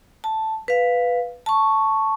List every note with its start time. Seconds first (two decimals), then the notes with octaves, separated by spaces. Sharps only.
0.24 A5
0.68 B4 F5
1.46 A5 C#6